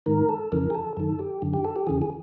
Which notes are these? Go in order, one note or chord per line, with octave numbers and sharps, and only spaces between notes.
G#2 D#3 A#4
A4
F2 C#3 E3 A#4
G#4
A4
F#2 D#3 A4
G4
F#2 D3
G4
A4
G4
E2 C#3 E3 G#4
G#4